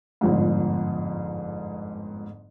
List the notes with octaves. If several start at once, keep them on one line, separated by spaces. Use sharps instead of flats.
G1 F2 G#2